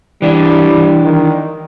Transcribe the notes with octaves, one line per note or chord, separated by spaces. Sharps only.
E3 G3 D4
D#3